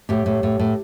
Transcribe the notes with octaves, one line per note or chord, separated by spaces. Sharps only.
A2 G4
A2
A2
A2